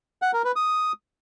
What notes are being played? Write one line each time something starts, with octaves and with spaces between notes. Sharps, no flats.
F#5
A#4
B4
D#6